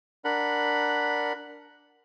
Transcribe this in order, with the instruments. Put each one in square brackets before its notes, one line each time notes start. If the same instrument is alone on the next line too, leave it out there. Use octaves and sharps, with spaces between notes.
[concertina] D4 A#4 F#5 B5